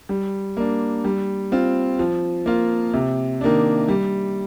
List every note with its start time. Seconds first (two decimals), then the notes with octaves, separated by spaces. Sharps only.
0.09 G3
0.57 A#3 D4
1.05 G3
1.52 C4 F4
1.99 F3
2.46 A#3 F4
2.94 C3
3.41 D#3 A#3 D4
3.89 G3